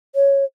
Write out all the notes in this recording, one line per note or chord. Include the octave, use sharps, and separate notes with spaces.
C#5